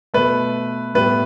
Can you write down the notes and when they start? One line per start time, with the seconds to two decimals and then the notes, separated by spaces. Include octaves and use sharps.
0.14 B2 A3 B4
0.95 A2 G3 B3 B4